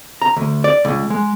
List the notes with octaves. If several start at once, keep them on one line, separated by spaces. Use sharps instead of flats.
A#5
D2
D5
C#2
G#3